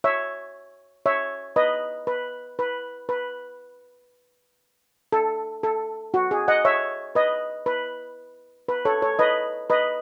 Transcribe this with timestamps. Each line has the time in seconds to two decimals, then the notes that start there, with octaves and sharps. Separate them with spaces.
0.04 C#5 E5
1.06 C#5 E5
1.56 B4 D#5
2.07 B4
2.59 B4
3.09 B4
5.13 A4
5.63 A4
6.14 F#4
6.31 G#4
6.48 D#5 F#5
6.65 C#5 E5
7.15 B4 D#5
7.66 B4
8.68 B4
8.85 A4 C#5
9.02 A4 C#5
9.19 B4 D#5
9.70 B4 D#5